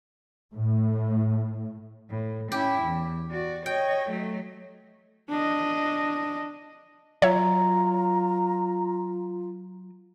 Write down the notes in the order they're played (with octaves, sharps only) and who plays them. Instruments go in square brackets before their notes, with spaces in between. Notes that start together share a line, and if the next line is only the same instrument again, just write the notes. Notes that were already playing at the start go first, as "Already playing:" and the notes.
[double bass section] A2
[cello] A2
[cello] C#4 E4 [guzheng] G4
[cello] E2
F#4 D5
[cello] C#5 D#5 [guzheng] G5
[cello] F#3 A3
[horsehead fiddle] D4 D#5
[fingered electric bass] F#3 [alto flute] F4 [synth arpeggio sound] C#5 E5 [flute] A#5